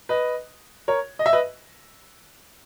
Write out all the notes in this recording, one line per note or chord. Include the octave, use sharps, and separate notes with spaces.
B4 D#5
A#4 C#5
D#5
E5
B4 D#5